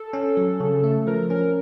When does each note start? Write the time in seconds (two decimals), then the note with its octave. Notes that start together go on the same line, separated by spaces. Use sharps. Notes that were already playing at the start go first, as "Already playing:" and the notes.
Already playing: A4
0.13 C#4
0.37 F#3
0.60 C#3
0.84 A3
1.07 F3 A#4
1.30 C#4 A#4